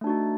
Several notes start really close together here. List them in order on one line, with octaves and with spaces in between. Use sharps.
A3 D4 F#4 D#4